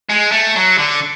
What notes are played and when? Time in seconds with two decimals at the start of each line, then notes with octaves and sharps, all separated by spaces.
0.09 G#3
0.32 A3
0.56 F#3
0.78 D3